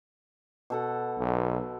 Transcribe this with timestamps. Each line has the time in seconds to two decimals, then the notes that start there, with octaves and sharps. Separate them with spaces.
0.70 B2 A4 F#5
1.19 B1